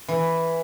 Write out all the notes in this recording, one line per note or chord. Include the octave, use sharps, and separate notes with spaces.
E3